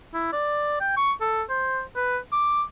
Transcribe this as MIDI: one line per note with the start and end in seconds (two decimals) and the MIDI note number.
0.14 0.29 64
0.33 0.79 74
0.80 0.95 79
0.97 1.13 85
1.21 1.42 69
1.50 1.82 72
1.96 2.18 71
2.33 2.63 86